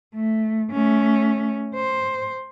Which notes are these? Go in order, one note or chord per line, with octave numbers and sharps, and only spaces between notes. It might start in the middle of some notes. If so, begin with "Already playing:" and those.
A3
A3 C#4
C5